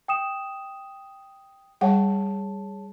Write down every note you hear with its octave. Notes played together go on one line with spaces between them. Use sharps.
G5 D#6 E7
G3 G#4 C#5 F#5 G5 A5